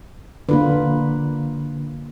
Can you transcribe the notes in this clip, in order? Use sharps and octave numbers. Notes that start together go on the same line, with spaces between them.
D3 A#3 F4 B4